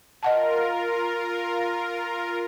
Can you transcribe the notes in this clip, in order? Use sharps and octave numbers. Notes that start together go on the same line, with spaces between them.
F4 A#4 D#5 F#5 A5